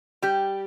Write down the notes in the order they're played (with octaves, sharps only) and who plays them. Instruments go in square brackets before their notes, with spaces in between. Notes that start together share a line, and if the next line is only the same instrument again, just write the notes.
[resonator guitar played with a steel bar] G3 G4